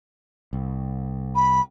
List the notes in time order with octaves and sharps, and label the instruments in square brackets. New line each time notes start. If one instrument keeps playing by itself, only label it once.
[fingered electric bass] C2
[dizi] B5